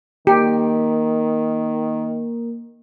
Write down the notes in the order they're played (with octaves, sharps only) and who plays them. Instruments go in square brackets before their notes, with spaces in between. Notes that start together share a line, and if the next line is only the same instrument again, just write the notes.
[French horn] D#3 [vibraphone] A#3 A#4 [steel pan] G4